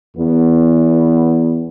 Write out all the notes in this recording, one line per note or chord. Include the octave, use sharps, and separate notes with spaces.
E2 B3